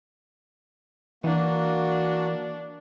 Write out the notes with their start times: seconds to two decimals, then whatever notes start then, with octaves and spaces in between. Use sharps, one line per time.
1.24 E3 A#3 D4 F#4